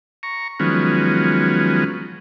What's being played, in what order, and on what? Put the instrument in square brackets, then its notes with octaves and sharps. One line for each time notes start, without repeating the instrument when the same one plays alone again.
[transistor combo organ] A#5 C#6
D#3 F3 F#3 G#3 B3 C#4